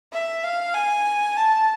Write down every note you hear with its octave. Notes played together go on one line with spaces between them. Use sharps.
E5
F5
G#5
A5